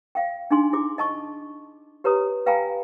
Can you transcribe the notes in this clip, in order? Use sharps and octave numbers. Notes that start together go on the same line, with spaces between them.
F5 G5
D4 D#4 G#4 G#5 C6
E4 G#4 D6
D#5 A5 C#6
G4 B4 C#5 A#5 D#6
B4 F5 G5 G#5 A#5 B5